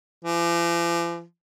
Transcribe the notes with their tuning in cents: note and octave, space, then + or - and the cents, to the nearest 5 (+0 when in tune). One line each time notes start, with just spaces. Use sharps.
F3 -45